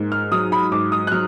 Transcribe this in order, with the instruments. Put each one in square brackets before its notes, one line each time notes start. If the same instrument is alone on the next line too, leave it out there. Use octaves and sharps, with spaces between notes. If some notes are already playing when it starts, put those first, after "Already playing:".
Already playing: [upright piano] G#2 A#3
F6
F#3 D#6
B5
G#2 D6
D#6
F#6
F#3 F6